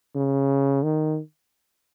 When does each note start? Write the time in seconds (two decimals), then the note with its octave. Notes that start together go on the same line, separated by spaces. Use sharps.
0.15 C#3
0.83 D#3